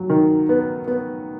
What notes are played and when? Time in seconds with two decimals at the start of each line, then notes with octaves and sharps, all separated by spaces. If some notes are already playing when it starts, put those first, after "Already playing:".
Already playing: F#3
0.09 D#3
0.49 B3
0.88 B3